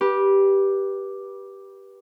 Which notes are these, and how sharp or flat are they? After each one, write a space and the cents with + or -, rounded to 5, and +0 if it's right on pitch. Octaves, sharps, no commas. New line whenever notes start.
G4 +0 B4 -20